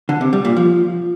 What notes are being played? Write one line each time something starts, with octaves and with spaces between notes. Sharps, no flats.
D3
C3
G3
A#2
F3